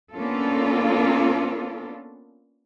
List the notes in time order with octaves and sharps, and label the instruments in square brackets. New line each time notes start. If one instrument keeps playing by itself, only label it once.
[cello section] A#3 B3 C#4 D4 F4 A4